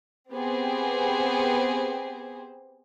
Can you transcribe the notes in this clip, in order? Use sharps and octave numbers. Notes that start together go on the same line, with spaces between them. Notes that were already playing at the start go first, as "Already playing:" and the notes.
B3 C4 G4 G#4 C5